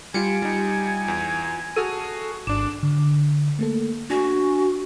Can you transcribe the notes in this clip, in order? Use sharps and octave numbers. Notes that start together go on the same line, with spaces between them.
G3 F4 G#5 C#7 D7
G3 D#4
E2
F#4 G#4 A4 F6 C7 D#7
G#1 D4 D6 E7
D3
A3 A#3 A4
D4 F#4 G#5